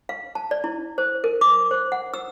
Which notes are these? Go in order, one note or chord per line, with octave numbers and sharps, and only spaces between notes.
F5
A5
D5
E4
C5
A#4
D6
C5
F#5
E6